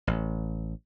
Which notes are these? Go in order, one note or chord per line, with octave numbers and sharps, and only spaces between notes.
A1